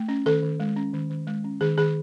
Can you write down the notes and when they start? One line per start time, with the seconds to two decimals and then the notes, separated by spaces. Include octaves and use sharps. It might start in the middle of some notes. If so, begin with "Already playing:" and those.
Already playing: A3
0.09 C#4
0.26 D#3 A4
0.43 D#3
0.60 G#3
0.76 C#4
0.93 D#3
1.10 D#3
1.27 G#3
1.44 C#4
1.61 D#3 G#4
1.78 D#3 G#4